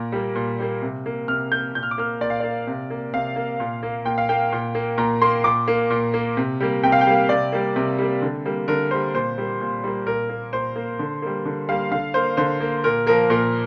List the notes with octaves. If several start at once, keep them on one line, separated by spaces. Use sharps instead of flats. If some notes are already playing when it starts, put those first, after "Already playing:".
Already playing: A#2
G3 A#3
A#2
G3 A#3
C3
A#3
C3 F6
A#3 G6
A#2 G6
F6
D6
A#3 F6
A#2 D5
F5
A#3 D5
C3
A#3
C3 F5
A#3
A#2
A#3
A#2 G5
F5
A#3 G5
A#2
A#3
A#2 A#5
A#3 C6
A#2 D6
A#3
A#2
A#3
C3
G3 A#3
C3 G5
F5
G5
G3 A#3
C3 D5
G3 A#3
C3
G3 A#3
D3
G3 A#3
D3 A#4
G3 A#3 C5
A#2 C5
G3 A#3
A#2
G3 A#3
A#2 A#4
A#3
A#2 C5
A#3
D3
G3 A#3
D3
G3 A#3 F5
D3 F5
A#3 C5
D3 C5
A#3
A#2 A#4
F3 A#3 A#4
A#2 A#4